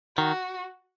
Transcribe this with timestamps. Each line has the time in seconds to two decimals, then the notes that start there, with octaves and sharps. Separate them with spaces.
0.17 D#3 F#4